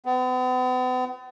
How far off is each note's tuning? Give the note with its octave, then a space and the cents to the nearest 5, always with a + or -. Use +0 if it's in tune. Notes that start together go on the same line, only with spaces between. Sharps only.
B3 +45